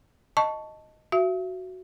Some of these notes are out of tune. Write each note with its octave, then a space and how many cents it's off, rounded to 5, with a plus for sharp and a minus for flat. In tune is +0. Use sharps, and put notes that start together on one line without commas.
D#5 +0 A5 +0 C#6 +10
F#4 +0 E5 +35